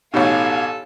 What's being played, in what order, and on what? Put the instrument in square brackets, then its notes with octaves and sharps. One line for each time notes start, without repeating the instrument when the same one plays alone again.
[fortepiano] A1 B2 [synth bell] D#4 G4 C#5 [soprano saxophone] A4 [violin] F5 G#5